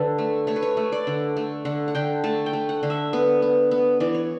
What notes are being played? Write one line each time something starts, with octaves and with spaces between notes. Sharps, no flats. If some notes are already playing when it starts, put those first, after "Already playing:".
Already playing: D3 A4 B4
A3
A3 C#5
B4
C#5
A3
D5
D3
A3
D3 F#5
F#5
D3 G5
A3 A5
G5
A3
F#5
D3
E5
B3
B3
B3
E3 D5
C#5